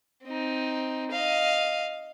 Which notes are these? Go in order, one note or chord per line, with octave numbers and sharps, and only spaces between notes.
C4 D#4
D#5 F5